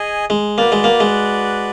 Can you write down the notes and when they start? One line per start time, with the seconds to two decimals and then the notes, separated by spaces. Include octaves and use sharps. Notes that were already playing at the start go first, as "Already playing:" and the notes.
Already playing: G#4 D#5 G#5
0.30 G#3
0.58 A#3 F#4 B4 D5
0.72 G#3
0.84 A#3
1.00 G#3